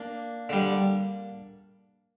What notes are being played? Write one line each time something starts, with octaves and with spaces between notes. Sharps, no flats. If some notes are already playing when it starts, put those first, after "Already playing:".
Already playing: A#3 D4
D3 G3